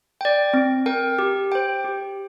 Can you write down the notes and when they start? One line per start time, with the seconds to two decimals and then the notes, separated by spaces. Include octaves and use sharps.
0.21 D5 G5
0.54 C4
0.86 A#4 G5
1.19 G4
1.52 C5 G5
1.84 G4